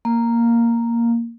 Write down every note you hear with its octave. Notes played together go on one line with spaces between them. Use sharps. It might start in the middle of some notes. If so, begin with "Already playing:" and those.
A#3